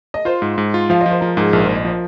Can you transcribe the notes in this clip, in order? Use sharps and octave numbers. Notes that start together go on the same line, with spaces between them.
D#5
F4 C5
G#2
G#2
F4
F3 F5
F3 D#5
C5
F3 A#4
G#2 G#4
A#1 A#4
C5
A#1
D#5
F3